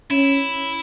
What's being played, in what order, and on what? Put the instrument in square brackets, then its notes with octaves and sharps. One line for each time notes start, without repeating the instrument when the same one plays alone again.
[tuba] C#4 [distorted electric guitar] E4